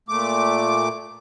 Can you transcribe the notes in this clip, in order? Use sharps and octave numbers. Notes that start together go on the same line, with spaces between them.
A#2 A3 D6